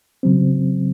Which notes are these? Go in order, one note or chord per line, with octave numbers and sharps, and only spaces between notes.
C#3 F#3 C4